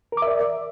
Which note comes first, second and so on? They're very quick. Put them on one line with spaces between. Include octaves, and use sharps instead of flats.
A#4 D6 E5 D5